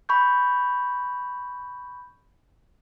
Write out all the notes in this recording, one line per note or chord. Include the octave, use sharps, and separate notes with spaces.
B5 C#6 G6